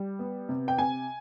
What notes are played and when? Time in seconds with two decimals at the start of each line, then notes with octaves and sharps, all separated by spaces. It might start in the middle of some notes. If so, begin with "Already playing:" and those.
Already playing: G3
0.19 B3
0.49 C3
0.68 G5
0.78 C3 G#5